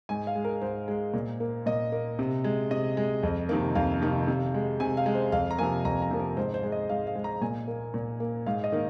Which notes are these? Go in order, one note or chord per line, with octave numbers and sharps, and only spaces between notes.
G#2 G#5
F5
G#3
A#4
G#2 C5
G#3
A#2
A#3
A#2 D#5
A#3
C3
G#3
C3 D#5
G#3
F2
C3 D#3 A#3
F2 F5
C3 D#3 A#3
C3
G#3
C3 G#5
F5
G#3
C5
F2 F5
A#5
C3 F3 A#3 G#5
F2 A#5
A#5
C3 F3 A#3
A#4
G#2 C5
C5
G#3
D#5
G#2 F5
F5
G#3
A#5
A#2 G#5
A#3
A#2
A#3
G#2 F5
D#5
D#3 A#3